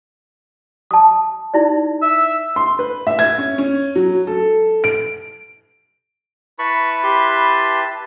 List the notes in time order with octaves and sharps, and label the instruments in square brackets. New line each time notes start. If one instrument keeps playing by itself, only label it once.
[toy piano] A5 D#6
D#4 E4 D5
[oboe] E5
[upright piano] C6
B4
E5
G#6
C#4
C#4
F#3
A4
D7
[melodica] E4 B4 A5 [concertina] B5 C#6
[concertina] G4 C6